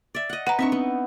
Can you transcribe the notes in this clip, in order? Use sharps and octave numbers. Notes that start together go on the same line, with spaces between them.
D5 E5
D#5 F#5
B4 F#5 A#5
C4 D4 D#4 E5 C#6
B3